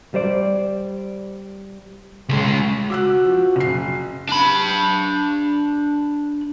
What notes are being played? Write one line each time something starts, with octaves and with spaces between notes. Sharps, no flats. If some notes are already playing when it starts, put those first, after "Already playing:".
G3 C5 D5
C#2 G#3
F#4 D6 E6 F#6
F3
F#1 C7
D4 B5